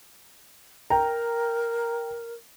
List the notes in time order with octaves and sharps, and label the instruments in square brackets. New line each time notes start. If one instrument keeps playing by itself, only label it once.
[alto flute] A#4 [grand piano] G5 A#5